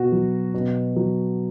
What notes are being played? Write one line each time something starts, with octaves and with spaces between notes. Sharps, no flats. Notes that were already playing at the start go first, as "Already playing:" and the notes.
Already playing: B2 F#4
F#3
B2
F#3